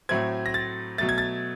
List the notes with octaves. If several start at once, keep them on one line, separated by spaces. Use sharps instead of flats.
A2 F#3 A3 C4 G#6
A#6
A6
B2 F#3 A3 A6
G#6
A6